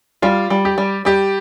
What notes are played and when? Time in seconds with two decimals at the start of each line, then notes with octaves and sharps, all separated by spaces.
0.22 G3 F4
0.50 G3
0.65 G4
0.78 G3
1.05 G3 G4